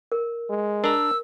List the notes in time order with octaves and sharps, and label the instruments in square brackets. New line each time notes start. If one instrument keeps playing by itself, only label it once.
[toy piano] A#4
[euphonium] G#3
[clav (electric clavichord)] D4 A#5 [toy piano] A#4 [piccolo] E6